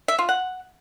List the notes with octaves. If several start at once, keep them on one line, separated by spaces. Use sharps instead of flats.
E5
F4
F#5